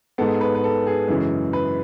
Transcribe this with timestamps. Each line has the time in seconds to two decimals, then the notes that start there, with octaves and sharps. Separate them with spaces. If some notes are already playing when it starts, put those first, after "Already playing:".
0.18 G#2 G#3 B3 A4
0.41 B4
0.55 B4
0.64 A4
0.87 G#4
1.08 F#2 C#3 E3 G#3
1.53 B4